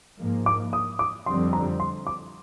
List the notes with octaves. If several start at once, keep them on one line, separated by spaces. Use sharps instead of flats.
G#2 F3 A#3
D6
D#6
D6
F2 D3 G3 C4 C6
A#5
C6
D6